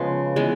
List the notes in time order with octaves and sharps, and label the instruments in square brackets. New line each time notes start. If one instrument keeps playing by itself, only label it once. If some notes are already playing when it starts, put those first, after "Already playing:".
Already playing: [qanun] C#3 F3 G#3 B3
E3 G#3 B3